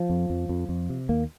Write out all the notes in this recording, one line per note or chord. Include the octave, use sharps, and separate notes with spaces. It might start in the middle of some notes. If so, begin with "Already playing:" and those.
Already playing: F3
F2
F2
F2
F2
C3
D#2 A#3